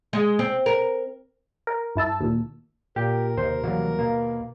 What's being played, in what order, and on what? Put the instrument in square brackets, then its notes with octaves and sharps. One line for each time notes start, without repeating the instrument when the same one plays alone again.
[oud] G#3
C4
A#4
[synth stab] A#4
G2 E4 A5 E6
D#2 A#2
[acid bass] A#2 [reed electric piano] G4 G5 [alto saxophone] A#4
[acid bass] D#2 [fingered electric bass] C3 [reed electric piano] C5
[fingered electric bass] C3 E3 G3 [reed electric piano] F#3 A#3
[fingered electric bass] B2 [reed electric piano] A#3